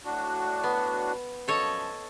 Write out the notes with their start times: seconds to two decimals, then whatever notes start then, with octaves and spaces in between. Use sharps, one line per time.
0.05 A2 D4 F#4
0.64 B3
1.48 F#2 F3 A4 C#5 D#5